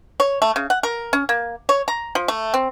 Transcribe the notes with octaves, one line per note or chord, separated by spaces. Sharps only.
C#5
A3
C#3
F#5
A#4
C#4
A#3
C#5
A#5
F3
A3
C4